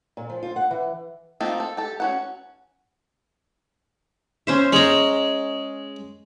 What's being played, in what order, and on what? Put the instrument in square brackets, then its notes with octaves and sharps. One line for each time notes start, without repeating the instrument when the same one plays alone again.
[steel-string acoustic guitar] A#2
F3
F4
F#5
E3
[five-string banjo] A3 A#3 C4 D#4 F4
A4
G4 A4
C#4 F#4 F#5
[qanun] C#4 C5 E5
[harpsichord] G#3 [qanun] C#5 A#5